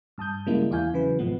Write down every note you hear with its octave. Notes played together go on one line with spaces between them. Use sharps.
G2 A5 D#6 G6
C#3 G3 G#3 A#3 E4
E2 E4 F5 G#5 G6
C#3 E3 F#3 B4
G#1 G#2 B2 F3 A3 B3